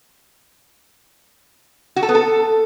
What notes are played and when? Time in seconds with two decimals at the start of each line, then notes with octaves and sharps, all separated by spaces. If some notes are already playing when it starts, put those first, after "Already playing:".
1.96 F#4
2.02 A4
2.09 B3
2.15 A4